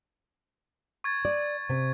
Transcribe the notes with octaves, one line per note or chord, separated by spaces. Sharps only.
C#6 G#6 A6
D5
C3